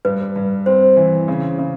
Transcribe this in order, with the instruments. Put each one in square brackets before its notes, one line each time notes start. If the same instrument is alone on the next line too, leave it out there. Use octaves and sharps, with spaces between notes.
[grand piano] G2 [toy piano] B4
[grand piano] G2
[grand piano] C4 [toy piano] C5
[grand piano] E3
C#3
C#3